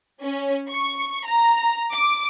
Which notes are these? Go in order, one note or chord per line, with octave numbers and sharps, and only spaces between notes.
C#4
C#6
A#5
D6